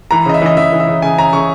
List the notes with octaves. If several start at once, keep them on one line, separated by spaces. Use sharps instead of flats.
E3 A#5
C#3 D#5
E5
E3 D#5
E3 E5
E3
E5
C#3
C#3 G#5
C#3 A#5
C#3 C#6